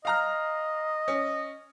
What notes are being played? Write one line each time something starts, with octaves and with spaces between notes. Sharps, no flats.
D#5 F5 A#5 F6
C#4